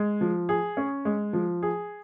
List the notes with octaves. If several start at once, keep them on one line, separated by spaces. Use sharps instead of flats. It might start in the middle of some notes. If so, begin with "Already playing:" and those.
Already playing: G#3
F3
G#4
C#4
G#3
F3
G#4